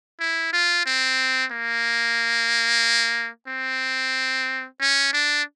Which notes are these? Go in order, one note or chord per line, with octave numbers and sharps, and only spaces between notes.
E4
F4
C4
A#3
C4
C#4
D4